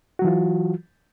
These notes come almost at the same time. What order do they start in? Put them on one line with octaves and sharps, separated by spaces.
F#4 F#3 E3 F4